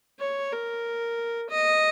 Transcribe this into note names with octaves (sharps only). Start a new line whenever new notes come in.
C#5
A#4
D#5